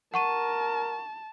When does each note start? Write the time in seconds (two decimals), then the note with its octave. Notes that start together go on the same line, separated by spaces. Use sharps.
0.14 A#4 F#5 A5 C#6 D#7